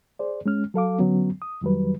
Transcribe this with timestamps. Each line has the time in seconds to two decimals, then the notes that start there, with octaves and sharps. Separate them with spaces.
0.19 G#4 C5 D5
0.46 G#3 C#4 F6
0.74 F#3 A4 F5 D6
0.99 D3 F#3 B3 C#4
1.42 D#6
1.61 F2 D#3 F#3 G3 B4